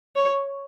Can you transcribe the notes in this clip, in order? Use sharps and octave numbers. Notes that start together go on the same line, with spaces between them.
C#5